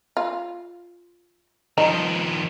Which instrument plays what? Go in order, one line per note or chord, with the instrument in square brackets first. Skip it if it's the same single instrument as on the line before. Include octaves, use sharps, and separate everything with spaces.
[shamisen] F4
[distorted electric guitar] D#3 F3 [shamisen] D#4